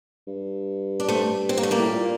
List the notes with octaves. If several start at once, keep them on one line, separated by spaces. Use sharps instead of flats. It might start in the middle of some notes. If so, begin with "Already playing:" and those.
G2
D4
A3 C4
C4
A#3
A3
G3 A#3
A2
A#2